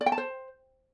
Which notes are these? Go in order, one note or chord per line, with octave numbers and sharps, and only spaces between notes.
D5
G5
A5
C5